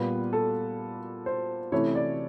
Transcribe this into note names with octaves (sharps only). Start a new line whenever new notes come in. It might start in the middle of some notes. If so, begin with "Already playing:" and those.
Already playing: A#2 G3 B3 B4
A4
C5
C3 E3 A3 C#4 E4 C#5
D5